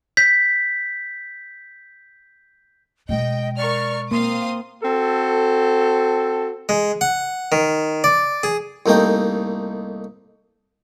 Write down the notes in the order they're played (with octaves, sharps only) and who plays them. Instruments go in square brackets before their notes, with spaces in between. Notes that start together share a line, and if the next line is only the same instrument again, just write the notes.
[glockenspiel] G6 B6
[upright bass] B2 G#3 [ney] D#5 [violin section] G5
[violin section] A#4 C#6 F6 [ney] D5
[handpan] A#3 [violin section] C4 F5 D#6 [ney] C6
[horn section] C4 F#4 A4
[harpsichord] G#3
F#5
D#3
D5
G#4
C2 A3 A#3 D#4 G5